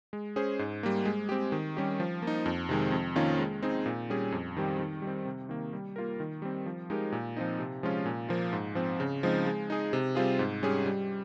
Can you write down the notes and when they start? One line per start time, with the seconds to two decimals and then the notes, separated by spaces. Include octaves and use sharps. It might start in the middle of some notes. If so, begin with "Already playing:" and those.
0.13 G#3
0.36 C#4 G#4 C5
0.59 G#2
0.83 G3 A#3
1.05 G#3
1.29 C4 G4
1.52 D#3
1.77 G3 C#4 G4
2.00 F3
2.22 A#3 D#4
2.46 F2
2.69 C3 D#3 G#3
2.92 F2
3.16 D#3 A#3 C#4 F4
3.39 G#3
3.63 C4 D#4 G#4
3.86 A#2
4.10 G3 C#4 G#4
4.32 F2
4.57 D#3 G3 C4 G4
4.79 D#3
5.02 G3
5.07 C4
5.25 C3
5.49 D#3 A#3
5.73 G3
5.96 A#3 F4 A#4
6.20 D#3
6.42 G3 C4
6.66 F3
6.90 G#3 D#4 G4 A#4
7.12 A#2
7.36 F3 C4 D#4
7.59 C3
7.83 F3 G#3 C#4 F4
8.06 A#2
8.29 F3 A#3 F4
8.53 G#2
8.75 F3 C4
9.00 C#3
9.23 F3 G#3 C4 D#4
9.46 G#3
9.70 D#4 G#4
9.93 C3
10.15 G3 C4 F4 G#4
10.39 G#2
10.63 G3 C#4 G#4
10.86 G3